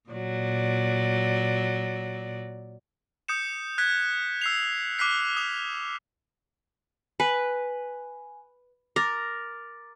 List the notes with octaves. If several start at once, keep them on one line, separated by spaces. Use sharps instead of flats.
A#2 F#3 D5
D#6 G6 C#7 E7
F#6 G#6 B6
E6 C7 F7
D6 F6 F#6 B6 C7
D#6 F7
B4 G#5
A#4 D6 A6